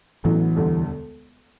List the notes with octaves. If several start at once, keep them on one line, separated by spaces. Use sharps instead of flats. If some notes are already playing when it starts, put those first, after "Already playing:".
A1 A2 E3 F#3 B3 E4
E1 D2 D3 G3